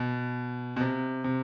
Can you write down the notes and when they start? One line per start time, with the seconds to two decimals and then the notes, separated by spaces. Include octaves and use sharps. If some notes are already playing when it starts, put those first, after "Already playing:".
Already playing: B2
0.76 B2
0.81 C3
1.24 C3